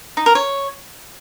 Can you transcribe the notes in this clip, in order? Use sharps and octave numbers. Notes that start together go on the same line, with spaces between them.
D#4
A#4
C#5